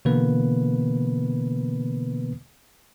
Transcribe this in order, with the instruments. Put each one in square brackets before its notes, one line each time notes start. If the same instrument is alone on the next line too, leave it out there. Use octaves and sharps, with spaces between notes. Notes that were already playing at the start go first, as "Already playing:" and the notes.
[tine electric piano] B2 D3 E3 A#3 B3 B4